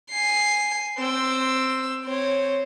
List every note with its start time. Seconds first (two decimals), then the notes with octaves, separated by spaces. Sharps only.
0.10 G#5 C7
0.98 C4 E6
2.05 C4 C#5